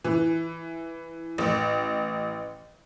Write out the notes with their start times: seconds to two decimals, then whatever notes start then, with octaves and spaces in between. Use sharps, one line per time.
0.04 E3
1.38 A1